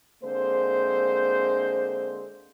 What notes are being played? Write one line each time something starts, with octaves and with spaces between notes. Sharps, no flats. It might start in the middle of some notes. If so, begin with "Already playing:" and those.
D3 G#3 A#3 C4 C5